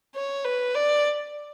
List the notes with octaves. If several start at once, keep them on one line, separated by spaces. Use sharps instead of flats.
C#5
B4
D5